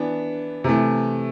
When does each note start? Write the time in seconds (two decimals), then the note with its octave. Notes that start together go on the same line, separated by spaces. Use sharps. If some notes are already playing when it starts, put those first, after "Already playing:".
Already playing: E3 B3 D4
0.64 C3 E3 A3